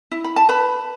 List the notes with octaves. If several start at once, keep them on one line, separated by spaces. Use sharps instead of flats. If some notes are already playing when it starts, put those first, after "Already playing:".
E4
B5
A5
B4 B5